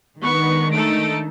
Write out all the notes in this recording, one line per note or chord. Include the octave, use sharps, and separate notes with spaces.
D#3 G#3 B3 D4 C#6
A3 D#4 A4 D7